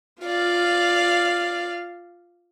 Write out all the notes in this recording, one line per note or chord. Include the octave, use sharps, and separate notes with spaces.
F4 D5 F5